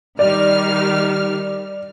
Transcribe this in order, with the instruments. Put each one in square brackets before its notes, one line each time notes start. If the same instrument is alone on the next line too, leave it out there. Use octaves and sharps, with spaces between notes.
[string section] D#3 G3 F6 [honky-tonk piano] D5